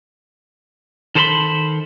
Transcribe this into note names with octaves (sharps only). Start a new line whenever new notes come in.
D#3 A4 C5 C#5 B5 C6